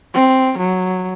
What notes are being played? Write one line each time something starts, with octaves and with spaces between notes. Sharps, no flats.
C4
F#3